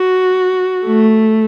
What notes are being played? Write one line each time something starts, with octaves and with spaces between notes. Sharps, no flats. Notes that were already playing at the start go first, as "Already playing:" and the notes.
Already playing: F#4
A3